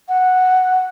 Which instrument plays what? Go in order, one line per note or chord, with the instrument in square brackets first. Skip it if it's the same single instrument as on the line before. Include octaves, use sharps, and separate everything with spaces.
[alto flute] F#5